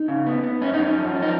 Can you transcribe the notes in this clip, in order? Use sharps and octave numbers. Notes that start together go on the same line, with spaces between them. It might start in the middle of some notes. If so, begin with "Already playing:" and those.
Already playing: D#4
C#3
B3
B3
F#2 C#4
D#4
F#2
C#4
F3
F3
D#4